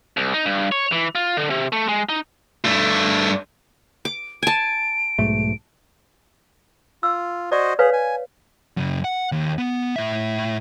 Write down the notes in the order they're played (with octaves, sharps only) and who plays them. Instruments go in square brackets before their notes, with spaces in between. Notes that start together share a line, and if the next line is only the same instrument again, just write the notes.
[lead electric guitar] C2
D#4
G2
C#5
E3
F4
D3
C3
A3
G#3
D#4
G2 A3
[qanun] D6
[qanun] G#5 A5 [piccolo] D7
[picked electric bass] B1 G#2 A3
[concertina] F4 [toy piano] E6
[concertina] F#4 C5 D#5 [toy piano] D5
[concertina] G#4 [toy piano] B4 C#5 F5
[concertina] G#5
[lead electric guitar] F#2 C#3
F#5
D#2
B3
A2 E5